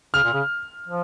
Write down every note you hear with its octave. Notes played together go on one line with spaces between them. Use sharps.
C#3 F6
A#2
C#3
F3